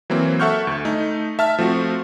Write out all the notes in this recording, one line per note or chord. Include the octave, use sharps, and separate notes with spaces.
E3 F#3 A#3 C4
A4 E5 F#5 C#6 F6 G6
D2
A3 D#4
E5 A5 F6
F3 A3 C4 F#4